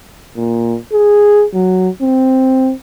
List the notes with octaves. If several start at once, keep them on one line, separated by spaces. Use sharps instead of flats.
A#2
G#4
F#3
C4